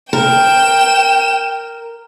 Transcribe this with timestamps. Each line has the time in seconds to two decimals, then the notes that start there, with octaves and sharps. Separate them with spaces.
0.13 A#4 G5 E7